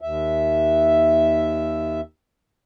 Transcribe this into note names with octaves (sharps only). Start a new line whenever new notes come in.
D#2 E5